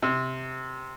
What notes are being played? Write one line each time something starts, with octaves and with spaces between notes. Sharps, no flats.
C3